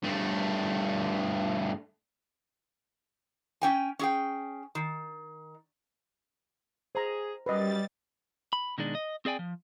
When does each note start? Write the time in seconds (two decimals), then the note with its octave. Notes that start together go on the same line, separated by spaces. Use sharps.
0.03 G2 A3
3.62 C#4 G5 G#5
3.99 C#4 G#4 G5
4.75 D#3
6.95 G#4 C5 A#5
7.46 F#2 G3 B4 D#5 A6
8.53 B5
8.78 B2 D#3 G#3 D4
8.95 D#5
9.25 C4 G#4 D5 G5 G#5
9.39 F3